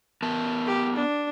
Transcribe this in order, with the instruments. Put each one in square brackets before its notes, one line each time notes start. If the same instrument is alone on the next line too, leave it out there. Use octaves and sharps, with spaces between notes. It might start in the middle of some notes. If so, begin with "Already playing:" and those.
[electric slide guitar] B3 A#4 A5
[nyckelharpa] G4
D4